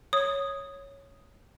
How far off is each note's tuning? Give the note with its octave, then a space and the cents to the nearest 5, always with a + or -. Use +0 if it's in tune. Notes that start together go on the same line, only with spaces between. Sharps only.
C#5 +0 D#6 +0